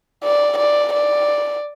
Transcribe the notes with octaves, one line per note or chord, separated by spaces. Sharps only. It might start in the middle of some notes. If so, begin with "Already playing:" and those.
D5
D5
D5